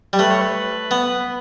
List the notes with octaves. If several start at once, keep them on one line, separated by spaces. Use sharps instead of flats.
G3
A3 B4
C#5
B4
B3